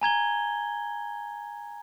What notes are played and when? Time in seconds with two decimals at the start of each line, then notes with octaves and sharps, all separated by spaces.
0.01 G#5 A#5 G#6 G7